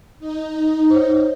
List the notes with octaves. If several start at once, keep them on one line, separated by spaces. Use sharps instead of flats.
D#4
C5 C#5